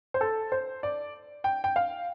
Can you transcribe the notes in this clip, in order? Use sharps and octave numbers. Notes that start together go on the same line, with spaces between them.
C5
A4
C5
D5
G5
G5
F5